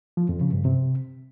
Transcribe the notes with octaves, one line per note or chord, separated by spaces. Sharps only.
F3
F2
C#3
G2
C3